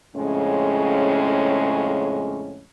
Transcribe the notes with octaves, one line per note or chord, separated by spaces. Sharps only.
F2 A2 C#3 G#3 C#4